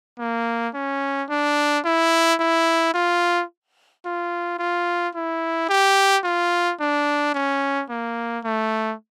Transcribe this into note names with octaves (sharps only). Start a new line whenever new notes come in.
A#3
C#4
D4
E4
E4
F4
F4
F4
E4
G4
F4
D4
C#4
A#3
A3